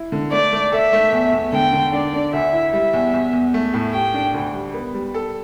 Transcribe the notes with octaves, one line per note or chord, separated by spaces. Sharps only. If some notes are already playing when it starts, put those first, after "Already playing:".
Already playing: E4
D3
A3 D5
A3
A4 E5
A3
E2
E2
D3 G5
D3
D4 D5
D4
D2 E5
E4
G3 E5
E2
E2
E2
A3
A2
G4 G5
D4
D2
G3
B3
G3
A4